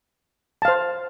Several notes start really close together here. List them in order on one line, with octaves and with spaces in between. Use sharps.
A5 F5 C5